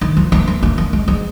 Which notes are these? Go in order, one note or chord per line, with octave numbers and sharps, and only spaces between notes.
D#3
F3
A#3
A#3
A#3
A#3
G#3
G#3